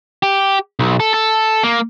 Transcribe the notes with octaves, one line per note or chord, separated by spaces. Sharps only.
G4
B1
A4
A4
A#3